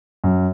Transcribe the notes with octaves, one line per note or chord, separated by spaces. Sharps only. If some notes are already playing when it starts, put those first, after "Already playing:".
F#2